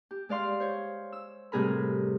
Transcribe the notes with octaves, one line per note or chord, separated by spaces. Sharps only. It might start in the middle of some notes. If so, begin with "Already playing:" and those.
G4
G#3 D5 F5 C6
C5 C#5
E6
A2 C3 G3 G#4 A#4 B5